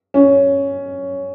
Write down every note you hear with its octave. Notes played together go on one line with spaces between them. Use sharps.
C#4